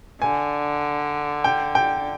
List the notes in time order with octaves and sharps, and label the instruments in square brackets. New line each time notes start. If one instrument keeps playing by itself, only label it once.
[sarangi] D3 [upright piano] G#5
[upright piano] G5
G5